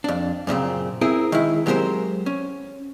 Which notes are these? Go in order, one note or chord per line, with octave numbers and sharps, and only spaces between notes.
F2 D4
F#2 A#2 C#3 C4
C4 E4 G#4 A#4
D#3 G#3 E4
F#3 G#3 C4 G4 A#4 C5
C#4